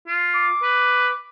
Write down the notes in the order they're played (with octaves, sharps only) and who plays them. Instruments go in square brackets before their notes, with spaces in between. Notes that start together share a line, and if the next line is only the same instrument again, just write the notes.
[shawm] F4
[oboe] D6
[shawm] B4